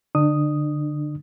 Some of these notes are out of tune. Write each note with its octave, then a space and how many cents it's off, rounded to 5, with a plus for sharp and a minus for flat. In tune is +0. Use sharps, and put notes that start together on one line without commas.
D3 +0 D4 +35 D#6 +0